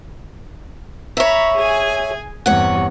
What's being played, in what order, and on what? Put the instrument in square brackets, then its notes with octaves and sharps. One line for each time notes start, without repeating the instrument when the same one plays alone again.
[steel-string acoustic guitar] C#5 E5 [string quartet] A#5 B5
[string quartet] G#4 G#5
[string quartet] E2 G2 C3 [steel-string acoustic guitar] C#5 F#5